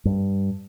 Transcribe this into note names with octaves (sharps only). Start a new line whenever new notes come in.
G2